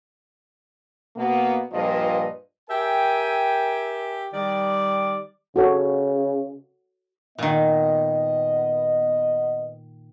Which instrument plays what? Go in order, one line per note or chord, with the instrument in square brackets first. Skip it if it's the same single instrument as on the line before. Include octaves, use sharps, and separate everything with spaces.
[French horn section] B2 A#3 B3
G2 A#2 F3 F4 B4 D#5
[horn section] G4 A#4 E5 G5 G#5
D#3 G3 D5
[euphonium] C#3 [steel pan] F#4 A4 C#5
[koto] A#2 D#3 [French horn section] B3 D#5